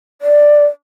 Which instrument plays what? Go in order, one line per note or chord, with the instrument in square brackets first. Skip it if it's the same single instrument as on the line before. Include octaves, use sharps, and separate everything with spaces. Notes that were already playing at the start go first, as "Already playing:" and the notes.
[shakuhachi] D5